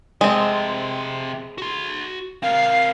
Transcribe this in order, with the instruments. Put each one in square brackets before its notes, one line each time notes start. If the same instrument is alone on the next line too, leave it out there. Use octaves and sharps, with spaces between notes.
[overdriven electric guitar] C3 F3 [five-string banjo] G#3 C4
[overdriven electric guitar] F#4 C6
[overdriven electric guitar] C4 A#4 [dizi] F5